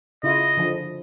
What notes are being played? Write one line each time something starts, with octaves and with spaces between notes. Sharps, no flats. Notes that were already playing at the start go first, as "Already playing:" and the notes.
C#3 E4 F4 D#5
D3 F3